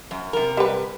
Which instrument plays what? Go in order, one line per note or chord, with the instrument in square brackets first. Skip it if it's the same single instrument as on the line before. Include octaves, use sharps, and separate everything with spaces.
[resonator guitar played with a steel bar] F#2
C3 A#4
[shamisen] G3 B4